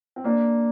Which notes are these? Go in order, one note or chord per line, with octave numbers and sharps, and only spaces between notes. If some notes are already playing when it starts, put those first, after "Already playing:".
C4
A#3 D4